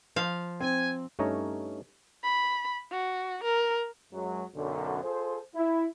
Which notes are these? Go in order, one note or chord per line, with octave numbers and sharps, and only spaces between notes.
F3 F5
C4 G#5
G2 A3 C#4 D#4 C#5 A#5
B5
F#4
A#4
F#2 F#3 G#3
B1 F#2 D3
F4 G#4 A4 C5
E4